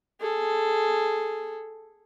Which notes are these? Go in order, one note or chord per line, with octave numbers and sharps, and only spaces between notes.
G#4 A4